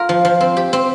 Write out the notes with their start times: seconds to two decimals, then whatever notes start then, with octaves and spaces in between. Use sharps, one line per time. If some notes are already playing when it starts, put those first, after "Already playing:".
Already playing: F4 A#4
0.09 F3
0.25 F3
0.41 C4
0.57 G4
0.73 C4